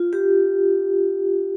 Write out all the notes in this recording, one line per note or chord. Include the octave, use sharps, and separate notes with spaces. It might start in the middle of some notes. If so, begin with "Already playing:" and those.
Already playing: F4
G4